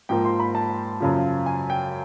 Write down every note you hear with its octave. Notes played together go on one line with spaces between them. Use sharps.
G#2 F3 A#3 G5
C6
B5
A5
F#2 C#3 F3
G#5
G5